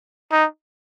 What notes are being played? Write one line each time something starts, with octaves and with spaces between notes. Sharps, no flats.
D#4